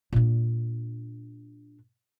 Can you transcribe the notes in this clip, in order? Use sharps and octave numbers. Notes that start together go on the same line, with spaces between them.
A#2 D4